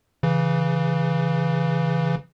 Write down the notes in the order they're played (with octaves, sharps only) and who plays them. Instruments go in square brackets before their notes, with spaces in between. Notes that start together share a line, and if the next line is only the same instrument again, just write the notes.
[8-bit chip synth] C#3 E3